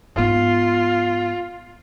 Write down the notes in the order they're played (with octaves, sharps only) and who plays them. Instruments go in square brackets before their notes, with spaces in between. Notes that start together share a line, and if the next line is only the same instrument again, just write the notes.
[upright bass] G#2 B3 [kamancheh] F4